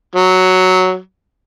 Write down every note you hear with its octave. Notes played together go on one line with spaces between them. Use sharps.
F#3